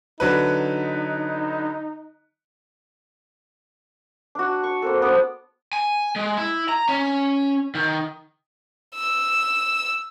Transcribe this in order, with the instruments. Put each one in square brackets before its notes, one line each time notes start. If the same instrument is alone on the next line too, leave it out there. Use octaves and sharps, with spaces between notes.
[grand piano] D3 F#3 B4 [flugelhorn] D#4
[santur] D4 F#4
C#6
A#3 C4 A4
B3 C4 D4 D5
[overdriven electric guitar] G#5
G#3
E4
A#5
C#4
D#3
[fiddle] E6